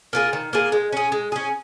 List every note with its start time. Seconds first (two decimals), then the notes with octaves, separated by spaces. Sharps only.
0.13 A#3 F4 G#4
0.33 D#3
0.53 A#3 F4 G#4
0.72 G#3
0.93 C#4 G#4
1.12 G#3
1.32 C#4 G#4